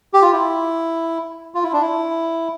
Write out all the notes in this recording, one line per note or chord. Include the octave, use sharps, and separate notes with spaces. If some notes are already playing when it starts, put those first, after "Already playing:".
G4
F4
E4
F4
E4
D4
E4